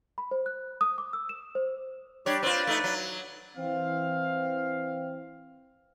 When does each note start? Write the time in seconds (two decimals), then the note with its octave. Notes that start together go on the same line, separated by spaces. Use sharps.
0.18 B5
0.31 C5
0.46 F#6
0.81 D#6
0.98 D6
1.13 E6
1.29 E7
1.55 C5
2.26 G3 D4 G4 C#5
2.43 C4 F4 B4 D5
2.67 A3 D#4
2.84 F#3
3.57 E3 C4 F5